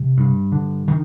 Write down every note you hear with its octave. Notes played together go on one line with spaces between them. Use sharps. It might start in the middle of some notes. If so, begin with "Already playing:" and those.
Already playing: C3
G2
D3
D3 D#3